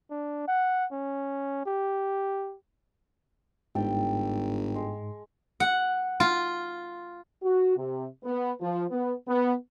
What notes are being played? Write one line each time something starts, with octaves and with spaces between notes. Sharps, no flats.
D4
F#5
C#4
G4
G1 G#2 G4 A4 G5
G#3
F#5
F4
F#4
C3
B3
F3
B3
B3